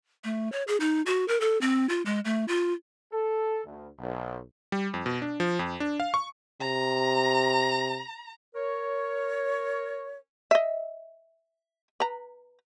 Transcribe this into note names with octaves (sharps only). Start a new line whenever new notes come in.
A3
C#5
G#4
D#4
F#4
A#4
A4
C4
F4
G#3
A3
F4
A4
D2
B1
G3
F2
B2
D4
F3
F2
D4
F5
C#6
C3 A#5
A#4 C#5
D#5 E5
B4 A#5